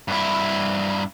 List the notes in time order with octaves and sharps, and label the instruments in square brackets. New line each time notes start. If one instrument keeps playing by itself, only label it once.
[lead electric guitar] G2 E4